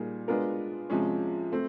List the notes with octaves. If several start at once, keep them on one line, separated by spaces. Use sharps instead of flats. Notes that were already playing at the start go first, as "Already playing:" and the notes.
Already playing: A#2 G3 A#3 D#4 G#4
G#3 B3 D4 F4 A#4
C3 F3 G#3 C#4
A3 C4